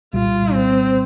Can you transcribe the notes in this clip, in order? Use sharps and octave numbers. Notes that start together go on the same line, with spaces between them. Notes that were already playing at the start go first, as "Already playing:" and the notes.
C2 A#2 G3 F4
C4